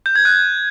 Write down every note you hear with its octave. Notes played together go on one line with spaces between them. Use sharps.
G6
G#6
F#6